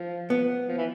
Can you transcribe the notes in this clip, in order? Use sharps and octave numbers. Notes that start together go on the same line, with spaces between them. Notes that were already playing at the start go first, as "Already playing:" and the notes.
Already playing: F3
B3
F3
E3